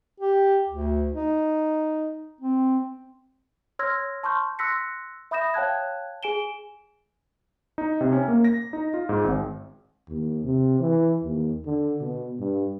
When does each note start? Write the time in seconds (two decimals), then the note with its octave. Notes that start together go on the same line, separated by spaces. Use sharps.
0.20 G4
0.69 D2
1.12 D#4
2.41 C4
3.79 C#5 C6 E6 F6 G#6 A#6
4.23 A5 C6 C#6 F6 G6
4.59 C6 E6 F#6 A#6 B6 C#7
5.31 E5 B5 D#6 G6 A#6 E7
5.54 C#5 F5 G5 A5 F#6 G#6
6.23 G#4 G#5 D7 E7 G7
7.78 D#4
8.01 C3
8.12 C#4
8.28 A#3
8.44 A#6
8.73 D#4
8.94 F4
9.09 G#2
9.24 G#1
10.08 D#2
10.44 C3
10.80 E3
11.23 D#2
11.65 D3
12.00 B2
12.40 G2